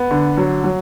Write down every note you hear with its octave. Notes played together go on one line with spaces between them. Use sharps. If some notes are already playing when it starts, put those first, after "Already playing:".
Already playing: B3
D3
F#3
F#3